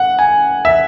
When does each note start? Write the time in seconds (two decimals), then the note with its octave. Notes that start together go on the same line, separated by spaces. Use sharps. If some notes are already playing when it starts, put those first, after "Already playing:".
Already playing: F#5
0.19 G#5
0.65 E5